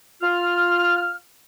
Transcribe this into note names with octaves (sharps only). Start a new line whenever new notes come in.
F4 F6